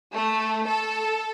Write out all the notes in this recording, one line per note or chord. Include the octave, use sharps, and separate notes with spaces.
A3
A4